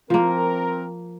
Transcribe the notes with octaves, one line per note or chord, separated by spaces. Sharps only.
F3 A#3 C4 A#4